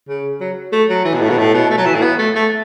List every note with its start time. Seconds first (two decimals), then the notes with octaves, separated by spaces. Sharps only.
0.08 C#3
0.40 F#3
0.72 A3
0.89 F#3
1.04 E3
1.13 B2
1.21 A2
1.29 B2
1.38 A2
1.54 B2
1.70 A3
1.77 F#3
1.85 E3
1.95 A2
2.02 B3
2.18 A3
2.35 A3